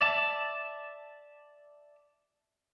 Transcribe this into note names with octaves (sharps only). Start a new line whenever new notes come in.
D5 E5 A5